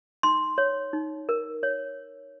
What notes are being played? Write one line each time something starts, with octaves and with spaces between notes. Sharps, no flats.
D#4 C6
C#5
D#4
A#4
C#5